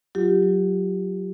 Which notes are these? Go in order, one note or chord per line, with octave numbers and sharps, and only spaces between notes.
F#3 F4 G4
F#3